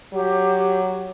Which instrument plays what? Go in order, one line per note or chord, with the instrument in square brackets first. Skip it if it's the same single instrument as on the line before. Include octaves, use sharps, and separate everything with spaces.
[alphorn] F#3 [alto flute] G4